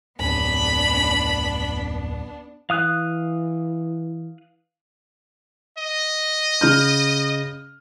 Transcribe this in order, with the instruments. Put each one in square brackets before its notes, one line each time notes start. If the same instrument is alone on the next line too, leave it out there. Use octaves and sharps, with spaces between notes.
[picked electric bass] D1 [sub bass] F2 [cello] B3 D4 [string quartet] B5
[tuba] E3 [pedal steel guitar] F5 D#6 F#6
[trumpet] D#5
[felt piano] C#3 F6 G6